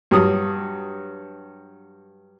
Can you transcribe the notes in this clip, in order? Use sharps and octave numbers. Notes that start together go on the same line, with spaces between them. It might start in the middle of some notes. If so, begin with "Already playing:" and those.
G2 F#3 D#6